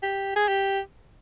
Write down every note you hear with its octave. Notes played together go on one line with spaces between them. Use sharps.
G4
G#4
G4